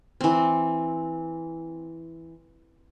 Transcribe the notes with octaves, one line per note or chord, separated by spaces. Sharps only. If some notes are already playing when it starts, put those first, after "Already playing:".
E3 C4